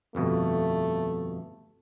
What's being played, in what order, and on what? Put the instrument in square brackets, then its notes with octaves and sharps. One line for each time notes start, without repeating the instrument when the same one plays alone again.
[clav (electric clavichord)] G1 F2 B2 [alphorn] A3